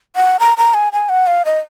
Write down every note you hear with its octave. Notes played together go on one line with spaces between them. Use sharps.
F#5
A#5
A#5
G#5
G#5
F#5
F5
D#5